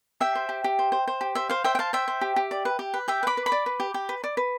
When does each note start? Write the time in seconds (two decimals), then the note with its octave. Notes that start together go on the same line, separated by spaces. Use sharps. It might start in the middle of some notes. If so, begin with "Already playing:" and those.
0.20 G4 E5 G5
0.35 C5
0.49 G4
0.64 G4
0.79 C5
0.92 C5
1.08 C5
1.21 G4
1.35 C5 E5
1.49 C5 F5
1.64 C5 E5 G5
1.75 G5
1.79 C5 F5 A5
1.93 C5 E5 G5
2.08 C5
2.21 G4
2.36 G4
2.51 D5
2.65 B4
2.79 G4
2.94 B4
3.08 G4 E5 G5
3.23 B4 B5 D6
3.37 B4
3.46 B5 D6
3.52 D5
3.66 B4
3.80 G4
3.94 G4
4.09 B4
4.24 D5
4.37 B4